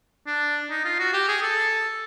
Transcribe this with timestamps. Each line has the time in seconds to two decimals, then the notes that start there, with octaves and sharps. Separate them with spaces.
0.27 D4
0.70 D#4
0.85 F4
0.99 F#4
1.13 G4
1.28 G#4
1.42 A4